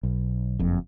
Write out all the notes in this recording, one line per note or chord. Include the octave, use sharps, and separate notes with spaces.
B1
F#1 F2